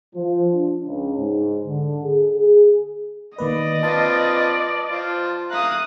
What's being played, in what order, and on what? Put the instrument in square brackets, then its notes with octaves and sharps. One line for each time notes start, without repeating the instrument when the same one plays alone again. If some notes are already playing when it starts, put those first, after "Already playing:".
[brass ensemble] F3
D4
C#2
G#2
D3
G#4
G#4
[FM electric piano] D#3 A#3 B4 [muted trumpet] D5 [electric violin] D#5
[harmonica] C4 F4 B4 [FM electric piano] A5 A6
[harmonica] F4 C5
[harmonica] E5 F5 A#5 [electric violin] D#6 F#6